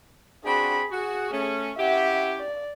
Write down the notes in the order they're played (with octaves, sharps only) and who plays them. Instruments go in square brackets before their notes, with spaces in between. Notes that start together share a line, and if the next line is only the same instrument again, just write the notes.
[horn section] C4 D4 F#4 [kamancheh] G#4 B5
[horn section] F#4 [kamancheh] G#4
[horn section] A3 C#4
[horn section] C#4 E4 G4 [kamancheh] E5 F#5
[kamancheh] D5